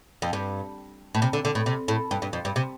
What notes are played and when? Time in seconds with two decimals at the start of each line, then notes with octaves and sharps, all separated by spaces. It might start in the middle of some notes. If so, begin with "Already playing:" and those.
0.22 F2
0.33 G2
1.15 A2
1.22 C3
1.33 D3
1.45 D3
1.55 A2
1.66 C3
1.88 A2
2.11 G2
2.22 G2
2.33 F2
2.45 G2
2.56 C3